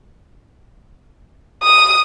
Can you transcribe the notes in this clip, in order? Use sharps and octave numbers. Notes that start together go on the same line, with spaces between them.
D#6